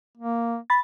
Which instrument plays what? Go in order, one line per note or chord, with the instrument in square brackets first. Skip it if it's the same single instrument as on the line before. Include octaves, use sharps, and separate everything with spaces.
[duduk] A#3
[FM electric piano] B5 A6